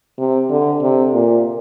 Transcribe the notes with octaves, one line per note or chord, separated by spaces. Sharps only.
C3
D3
C3
A#2